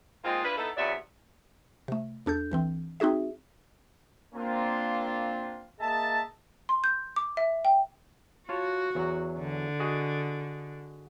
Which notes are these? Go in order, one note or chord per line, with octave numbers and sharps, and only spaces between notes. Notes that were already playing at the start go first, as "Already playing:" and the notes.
G#3 A#3 C4 D#4 F4
D4 E4 F4 B4
B3 D#4 E4 A4
E2 C3 F#3 B3 D5 E5
C3 A3
E2 D4 A4 G6
C2 E3 C4
C4 D#4 F#4 G#4 E5
A#3 C4 D4 F4
A#3 G#4 D#5 E5 A5
C6
G6
D6
E5
G5
F4 F#4 C#5 A5
E2 F#3
D3
F#4 G#4 D#5